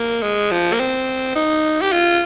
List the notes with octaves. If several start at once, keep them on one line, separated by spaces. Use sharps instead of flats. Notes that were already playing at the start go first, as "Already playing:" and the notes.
Already playing: A#3
G#3
F3
A#3
C4
D#4
G4
F4